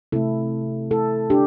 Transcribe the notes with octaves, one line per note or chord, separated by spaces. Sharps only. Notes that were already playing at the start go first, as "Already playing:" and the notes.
C3 A3 E4 A4
E4 A4
D4 G4